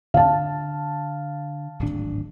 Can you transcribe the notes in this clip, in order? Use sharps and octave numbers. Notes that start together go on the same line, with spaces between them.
D3 F5 A5
D1 G#1 D4